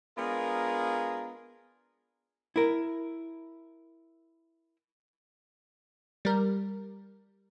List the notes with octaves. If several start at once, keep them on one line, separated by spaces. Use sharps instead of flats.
G#3 B3 D4 F4 A#4
E4 A#4
G3 A#4